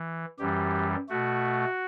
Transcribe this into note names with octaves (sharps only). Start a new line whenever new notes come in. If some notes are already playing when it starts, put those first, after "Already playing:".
Already playing: E3
F#2 E3 G3 G4
B2 A3 F#4